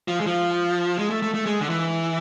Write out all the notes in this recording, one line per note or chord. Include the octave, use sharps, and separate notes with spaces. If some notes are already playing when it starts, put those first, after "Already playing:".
F3
G#3
F3
G#3
A3
A3
A3
G#3
D3
E3